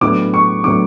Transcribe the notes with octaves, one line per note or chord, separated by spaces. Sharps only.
A2 F#3 B3 D4 D6
C#6
A2 F#3 B3 D4 D6